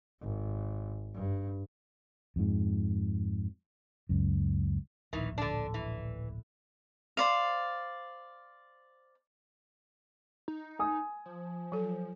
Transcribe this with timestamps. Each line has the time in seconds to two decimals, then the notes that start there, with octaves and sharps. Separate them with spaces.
0.21 G#1
1.15 G2
2.36 F2 G#2
4.09 C#2 F#2
5.13 D1 A#1 D#3 E3
5.38 D3 D4
5.74 E3
7.17 C5 D5 F5
10.48 D#4
10.79 G#5 D#6
11.26 F3
11.72 F#3 A4